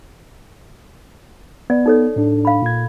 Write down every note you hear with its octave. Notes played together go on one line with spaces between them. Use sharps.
B3 D5
D#4 A4 C#5
A2 D4
F5 B5
A#2 G#6